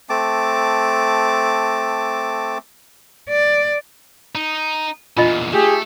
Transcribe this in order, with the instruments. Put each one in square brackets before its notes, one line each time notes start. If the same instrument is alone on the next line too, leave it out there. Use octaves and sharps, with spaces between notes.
[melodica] A3 C4 A5 D6
[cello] D5
[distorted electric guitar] D#4
[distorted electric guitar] E2 A#2 [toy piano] D4 F4 D#5
[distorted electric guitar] A3 [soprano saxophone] G4 [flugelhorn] G#4